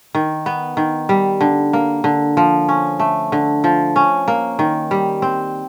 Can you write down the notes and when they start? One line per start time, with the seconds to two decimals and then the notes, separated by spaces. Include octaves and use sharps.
0.15 D#3
0.46 B3
0.77 D#3
1.09 G3
1.41 D3
1.73 A#3
2.04 D3
2.37 F3
2.69 C#4
3.00 A3
3.32 D3
3.64 F3
3.96 C#4
4.28 A#3
4.59 D#3
4.91 G3
5.22 C4